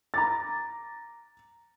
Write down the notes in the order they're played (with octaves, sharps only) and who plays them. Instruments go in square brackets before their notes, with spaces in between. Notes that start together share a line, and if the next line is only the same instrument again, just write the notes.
[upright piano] A#5 D6 A6